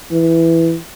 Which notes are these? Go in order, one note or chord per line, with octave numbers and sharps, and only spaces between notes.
E3